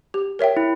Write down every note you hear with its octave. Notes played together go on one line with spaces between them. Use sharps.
G4
A#4 C#5 E5 G5
E4